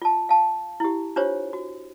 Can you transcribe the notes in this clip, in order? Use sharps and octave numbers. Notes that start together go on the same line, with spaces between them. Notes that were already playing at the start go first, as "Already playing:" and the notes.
F4 A5
F5 A5
E4 G4
D4 F4 G4 C5 C#5
F#4